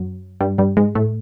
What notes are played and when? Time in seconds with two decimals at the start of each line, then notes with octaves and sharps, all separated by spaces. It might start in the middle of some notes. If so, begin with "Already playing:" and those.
Already playing: F#2 F#3
0.41 G2 G3
0.58 G2 G3
0.77 G#2 G#3
0.95 A2 A3